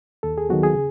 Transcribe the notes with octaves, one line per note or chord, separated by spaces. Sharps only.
D#2 A4
G#4
D#3 F#3 B3 F#4
G#4
C#3